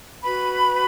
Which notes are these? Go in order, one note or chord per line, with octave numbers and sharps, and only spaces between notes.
F#4 B4 B5